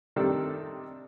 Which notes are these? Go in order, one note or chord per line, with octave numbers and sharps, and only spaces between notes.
C3 D#3 G3 D4 D#4 A4